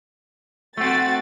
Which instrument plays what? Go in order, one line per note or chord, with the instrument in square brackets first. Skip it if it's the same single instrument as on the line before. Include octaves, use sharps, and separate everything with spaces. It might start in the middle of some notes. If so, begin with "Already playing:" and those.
[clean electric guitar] A3 C4 [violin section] F#4 A6